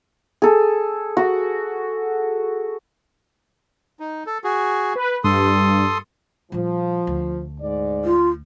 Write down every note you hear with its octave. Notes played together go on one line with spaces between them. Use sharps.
G#4 A4
F#4
D#4
A4
F#4 G#4
B4
G2 A4 C6 D#6
A#2 F3 G3
D2
G#2 D5
F4